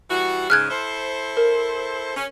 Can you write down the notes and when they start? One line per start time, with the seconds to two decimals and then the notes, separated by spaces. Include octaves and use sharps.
0.10 E3 G3 F#4
0.50 G#2 C#3 F6 F#6 G#6
0.70 E4 A4 C5
1.37 A#4
2.16 C#4